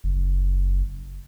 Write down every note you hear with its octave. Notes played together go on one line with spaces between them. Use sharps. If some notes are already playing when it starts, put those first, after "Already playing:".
F#1